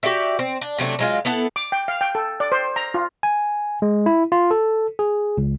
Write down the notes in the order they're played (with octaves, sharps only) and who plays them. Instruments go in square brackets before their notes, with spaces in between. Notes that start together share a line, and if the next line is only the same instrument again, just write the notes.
[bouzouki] F#4 G4 D5 E5
C4
D4
C3 F#3 A3 D4
F#3 G#3 F4
B3 E4 A4 F#5
[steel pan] D6
G5
F5
G5
A4
D5
C5
A#5
F4
[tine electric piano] G#5
G#3
E4
F4
A4
G#4
C#2